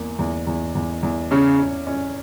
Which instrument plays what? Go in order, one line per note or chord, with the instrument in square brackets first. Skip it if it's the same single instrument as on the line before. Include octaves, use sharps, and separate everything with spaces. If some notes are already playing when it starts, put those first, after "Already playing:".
Already playing: [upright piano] E2 A#3
E2
E2
E2
E2
[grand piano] C#3 [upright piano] C#4
[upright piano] C#4
C#4